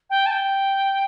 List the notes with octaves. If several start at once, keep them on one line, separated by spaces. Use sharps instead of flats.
G5
A5
G5